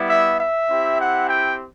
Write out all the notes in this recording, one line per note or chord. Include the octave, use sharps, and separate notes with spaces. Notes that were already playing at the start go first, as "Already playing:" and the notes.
Already playing: G3 B3 E4
E5
E5
C4 E4 G4
F#5
G5